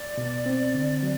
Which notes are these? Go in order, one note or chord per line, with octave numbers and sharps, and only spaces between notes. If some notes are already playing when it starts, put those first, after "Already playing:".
Already playing: D5
B2
C4
D3
F#3